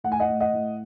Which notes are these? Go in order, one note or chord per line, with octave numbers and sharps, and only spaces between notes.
A2 F#5
G#5
D#5 F#5
A2
D#5 F#5
A2